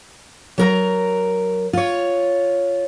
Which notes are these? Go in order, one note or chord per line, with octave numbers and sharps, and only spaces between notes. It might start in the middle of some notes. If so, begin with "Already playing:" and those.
F#3 A#4 A#5
F4 C#5